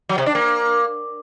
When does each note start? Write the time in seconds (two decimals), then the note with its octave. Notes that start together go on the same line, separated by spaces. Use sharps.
0.09 F#3
0.18 C3
0.26 D4
0.35 A#3